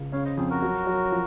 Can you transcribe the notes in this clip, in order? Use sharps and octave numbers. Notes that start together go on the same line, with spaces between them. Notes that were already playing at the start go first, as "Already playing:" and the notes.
Already playing: C#2
C#3 C#5 F5
C5 D#5
F2 G#4 C5
F#4 A#4
F#3
F#3
F3